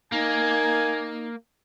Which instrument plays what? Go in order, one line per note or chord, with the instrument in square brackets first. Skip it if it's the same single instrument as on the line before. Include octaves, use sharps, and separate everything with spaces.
[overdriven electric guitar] A#3 [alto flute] D#4 [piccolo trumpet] G#5